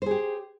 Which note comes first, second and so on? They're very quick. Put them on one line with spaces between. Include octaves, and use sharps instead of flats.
C5 G#4 G4